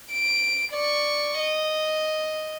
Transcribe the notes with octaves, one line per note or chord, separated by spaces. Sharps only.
D7
D5 C#6
D#5